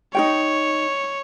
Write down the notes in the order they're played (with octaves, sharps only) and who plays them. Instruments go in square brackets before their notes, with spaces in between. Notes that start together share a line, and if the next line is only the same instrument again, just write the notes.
[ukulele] D#4 F#4 G5 [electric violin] C#5